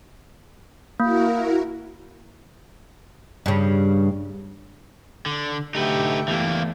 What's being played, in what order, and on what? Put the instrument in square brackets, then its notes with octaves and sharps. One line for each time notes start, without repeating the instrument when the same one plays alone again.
[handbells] A#3 [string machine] E4 F#4 A#4
[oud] G2 C#3
[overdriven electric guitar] D3
[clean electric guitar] D2 D3 A3 [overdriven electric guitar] D#4 B4 [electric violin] G4 E5
[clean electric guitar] E2 A3 [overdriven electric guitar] E3 A#3